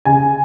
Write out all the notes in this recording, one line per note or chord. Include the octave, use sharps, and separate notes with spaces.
C#3 G#5